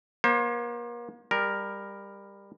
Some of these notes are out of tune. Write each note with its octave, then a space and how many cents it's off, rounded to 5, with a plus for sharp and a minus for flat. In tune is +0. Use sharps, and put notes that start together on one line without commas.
A#3 +40 C5 +35
G3 +20 A#4 +0